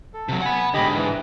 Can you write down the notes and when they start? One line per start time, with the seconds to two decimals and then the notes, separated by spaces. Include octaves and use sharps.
0.14 A4
0.29 C3 F#3
0.42 F#5 G#5 B5
0.74 G#2 D3 G4 D#5 B5
0.95 E3